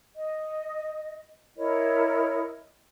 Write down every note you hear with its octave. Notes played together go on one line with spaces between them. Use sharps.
D#5
E4 A#4 C#5 D#5